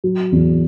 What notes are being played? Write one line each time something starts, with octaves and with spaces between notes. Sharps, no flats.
F#3
E2